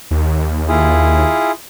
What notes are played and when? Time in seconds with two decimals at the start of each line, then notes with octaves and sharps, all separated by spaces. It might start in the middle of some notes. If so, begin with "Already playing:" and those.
0.11 D#2
0.68 E4 F4 G#4